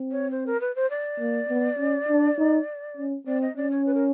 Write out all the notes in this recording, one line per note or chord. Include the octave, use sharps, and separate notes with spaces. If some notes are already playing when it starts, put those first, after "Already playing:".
Already playing: C4
C#5
C5
A#4
B4
C5
D5
A#3
B3
C#4
D4
D#4
C#4
C4 D5
D#5
C#4 D5
C#5
B4
A#4